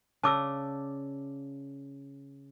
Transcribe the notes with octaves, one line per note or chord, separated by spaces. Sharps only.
C#3 D5 A5 D6 E6